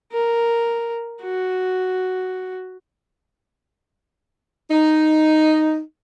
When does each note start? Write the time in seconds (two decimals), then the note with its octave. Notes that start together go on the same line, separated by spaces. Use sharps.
0.13 A#4
1.22 F#4
4.71 D#4